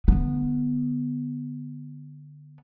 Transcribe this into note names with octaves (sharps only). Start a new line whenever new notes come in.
D3 B3